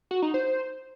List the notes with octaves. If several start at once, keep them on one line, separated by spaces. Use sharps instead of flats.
F#4
D#4
C5